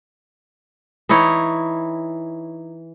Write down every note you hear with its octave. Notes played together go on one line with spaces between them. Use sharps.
E3 D#4 E4 C#5